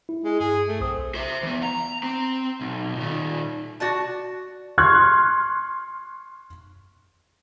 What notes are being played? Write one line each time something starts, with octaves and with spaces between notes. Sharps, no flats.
E4
G#3
G2 G#4
A3
B1 C4 D#6
C5 E5
E3 B3
A#5
C4
B1
A#2 D#3
F#4 D5 A5
C6 C#6 F6 F#6 G#6